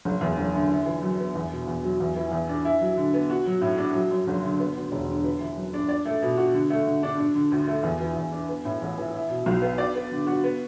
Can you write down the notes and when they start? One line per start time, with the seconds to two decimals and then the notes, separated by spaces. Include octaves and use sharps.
0.05 F#1
0.21 E2
0.38 F#1
0.54 D3
0.70 E4
0.85 E3
1.02 F#2
1.19 B3
1.35 E2
1.51 B2
1.67 E2
1.83 F#3
2.00 E2
2.16 E3
2.32 E2
2.49 D4
2.65 E4
2.81 F#3
2.97 D3
3.14 B3
3.30 F#4
3.46 F#3
3.61 A2
3.78 D4
3.94 F#3
4.11 F#2
4.27 F#1
4.44 D3
4.59 B3
4.75 D2
4.92 E1
5.08 D3
5.24 B4
5.40 E3
5.56 F#2
5.73 D4
5.89 D5
6.06 A3
6.22 B2
6.37 F#4
6.54 D3
6.70 A3
6.86 D3
7.03 D4
7.18 D4
7.35 D3
7.51 D2
7.67 A3
7.83 E2
8.01 E3
8.17 E2
8.32 D4
8.49 B3
8.65 A2
8.82 A1
8.98 E3
9.14 E4
9.29 B2
9.46 B1
9.62 B3
9.78 D5
9.95 B3
10.11 D3
10.27 F#4
10.44 B3